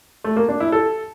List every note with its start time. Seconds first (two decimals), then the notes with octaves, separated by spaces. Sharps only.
0.24 A3
0.36 A#3
0.48 D4
0.60 E4
0.72 A4